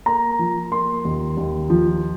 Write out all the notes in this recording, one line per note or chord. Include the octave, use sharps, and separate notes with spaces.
A#3 A#5
F3
A#3 C6
D#2
D#2
F3